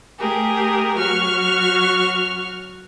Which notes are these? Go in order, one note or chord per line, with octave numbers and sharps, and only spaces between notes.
A3 G4 G#4 A#4
F#3 F#4 C#6 F6